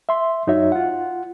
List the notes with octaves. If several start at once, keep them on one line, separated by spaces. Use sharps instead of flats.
E5 C6
F#2 D#4 F#4 C#5 E5
F4 F#5